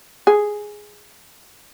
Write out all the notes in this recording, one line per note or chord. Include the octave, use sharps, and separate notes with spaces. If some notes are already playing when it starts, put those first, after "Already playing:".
G#4